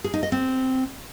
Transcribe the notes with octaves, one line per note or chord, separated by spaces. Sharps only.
G#4
D#4
D#5
C4